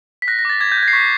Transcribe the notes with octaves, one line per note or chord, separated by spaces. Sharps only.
B6
F#6 A#6
A#6
D6 A6
D6 G#6
G6
F#6
G#6
C7
C#6 B6